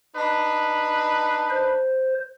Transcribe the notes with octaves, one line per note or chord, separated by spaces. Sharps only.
D4 D#4 B4
C5